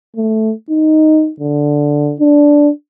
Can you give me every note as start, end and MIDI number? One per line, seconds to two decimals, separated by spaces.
0.16 0.52 57
0.70 1.30 63
1.40 2.15 50
2.20 2.70 62